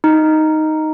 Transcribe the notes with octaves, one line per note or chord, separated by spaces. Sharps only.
D#4